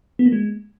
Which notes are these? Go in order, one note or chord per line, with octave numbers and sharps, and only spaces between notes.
B3
A#3
G#3